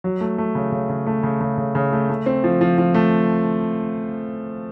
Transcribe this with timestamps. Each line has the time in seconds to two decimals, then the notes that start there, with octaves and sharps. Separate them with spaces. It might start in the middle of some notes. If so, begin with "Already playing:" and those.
0.04 F#3
0.21 A3
0.38 A3
0.55 C#3
0.72 C#3
0.89 C#3
1.06 A3
1.23 C#3
1.41 C#3
1.58 C#3
1.75 C#3
1.93 A3
2.10 A3
2.26 C4
2.44 F3
2.61 F3
2.78 F3
2.94 A3